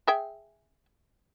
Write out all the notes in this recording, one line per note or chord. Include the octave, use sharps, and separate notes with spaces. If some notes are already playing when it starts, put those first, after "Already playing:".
G#4 E5 G5